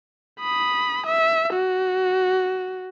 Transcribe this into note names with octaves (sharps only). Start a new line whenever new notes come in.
B5 D#6
E5
F#4